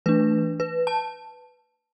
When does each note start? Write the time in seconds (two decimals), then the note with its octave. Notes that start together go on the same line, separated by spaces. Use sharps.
0.06 E3 A3 D4 B4
0.60 B4
0.87 A5